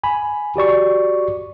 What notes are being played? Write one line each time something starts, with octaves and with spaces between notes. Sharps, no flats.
G#5 B5
F#4 G4 D5 C#6